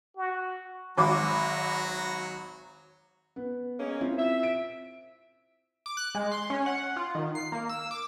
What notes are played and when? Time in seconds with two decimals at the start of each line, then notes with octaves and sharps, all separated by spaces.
0.17 F#4
0.98 G#1 F#3 F#4 A#5 D6
3.36 B3
3.79 G#3 A#3 C#4
4.01 C4 E4 F4
4.18 E5
4.43 D7
5.86 D6
5.97 F#6
6.15 G#3
6.32 C6
6.50 C#4
6.66 F#5
6.96 F4
7.15 D#3
7.35 C7
7.52 A#3
7.69 E6
7.91 D6